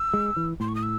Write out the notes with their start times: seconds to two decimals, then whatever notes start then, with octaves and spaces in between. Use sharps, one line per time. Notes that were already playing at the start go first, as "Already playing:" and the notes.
Already playing: E6
0.14 G#3
0.37 E3
0.60 A2 C6
0.68 C#6
0.75 D#6
0.83 E6